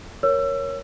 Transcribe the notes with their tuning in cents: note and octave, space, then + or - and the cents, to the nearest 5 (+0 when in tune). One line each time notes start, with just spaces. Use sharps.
A#4 +5 C#5 +0 E6 +30